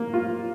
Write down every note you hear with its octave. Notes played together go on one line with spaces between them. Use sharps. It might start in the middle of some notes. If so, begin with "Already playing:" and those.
Already playing: A#3
F4